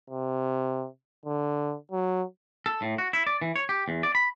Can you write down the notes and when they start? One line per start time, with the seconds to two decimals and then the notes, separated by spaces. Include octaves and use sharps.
0.10 C3
1.26 D3
1.91 F#3
2.66 A4
2.82 A2
2.98 F#4
3.13 E4
3.27 D5
3.42 E3
3.56 C#5
3.69 G4
3.88 E2
4.03 D5
4.15 B5